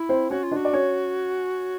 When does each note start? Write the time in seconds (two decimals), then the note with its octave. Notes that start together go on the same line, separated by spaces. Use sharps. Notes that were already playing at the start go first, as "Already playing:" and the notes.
Already playing: E4
0.09 C4 C5
0.30 C#4 F#4 C#5
0.43 F4
0.51 D4 D5
0.56 F#4
0.65 D5
0.73 C#4 C#5